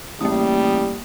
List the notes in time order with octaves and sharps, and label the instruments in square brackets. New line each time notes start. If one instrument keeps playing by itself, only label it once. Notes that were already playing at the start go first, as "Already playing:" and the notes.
[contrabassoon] A1 [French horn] G3 [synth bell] A#3 D#6